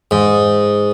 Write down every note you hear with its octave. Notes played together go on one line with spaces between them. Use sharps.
G#2